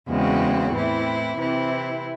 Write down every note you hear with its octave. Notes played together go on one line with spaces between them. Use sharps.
E2 C#3 G#3 C4 F#4
A2 E3 C4 E4
C3 E3 C4 E4